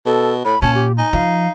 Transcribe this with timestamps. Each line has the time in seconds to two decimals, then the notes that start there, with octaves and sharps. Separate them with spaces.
0.06 B2 A4
0.45 A2 B5
0.62 A#2 C#4 A5
0.75 G4
0.98 D#4 G#5
1.13 F3 F5